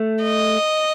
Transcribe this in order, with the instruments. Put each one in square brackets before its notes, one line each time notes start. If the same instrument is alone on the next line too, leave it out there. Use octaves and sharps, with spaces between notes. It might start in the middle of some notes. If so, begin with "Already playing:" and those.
Already playing: [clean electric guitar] A3
[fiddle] D#5